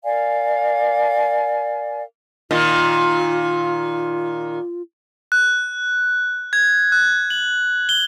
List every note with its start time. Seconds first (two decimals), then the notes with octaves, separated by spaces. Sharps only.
0.04 A#4 D5 F5 G#5
2.51 A#2 D#3 F4 D#5
5.32 F#6
6.53 G#6
6.92 F#6
7.30 F#7
7.89 G7